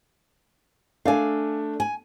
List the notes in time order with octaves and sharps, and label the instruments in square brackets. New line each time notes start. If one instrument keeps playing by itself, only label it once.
[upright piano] A3 D4 [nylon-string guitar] F5 G#5
[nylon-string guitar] G#5